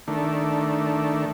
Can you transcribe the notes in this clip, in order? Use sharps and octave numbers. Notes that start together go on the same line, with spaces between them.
D#3 A3 D4